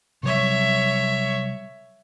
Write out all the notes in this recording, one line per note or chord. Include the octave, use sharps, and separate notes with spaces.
C3 F#3 G3 C#5 E5